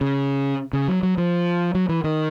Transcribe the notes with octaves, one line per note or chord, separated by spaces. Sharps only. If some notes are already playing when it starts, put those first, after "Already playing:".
C#3
C#3
F#3
F#3
F3
F#3
E3
D#3